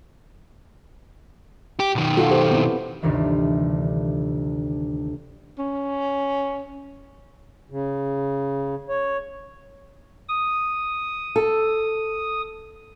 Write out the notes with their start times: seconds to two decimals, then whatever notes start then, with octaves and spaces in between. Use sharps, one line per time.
1.80 G4
1.95 B1 D#3
2.17 F4 F#4 A4
2.31 G4 C5
2.51 B3 C4 E4
3.02 G1 D2 C3 D#3 E3
5.59 C#4
7.71 C#3
8.89 C#5
10.28 D#6
11.36 A4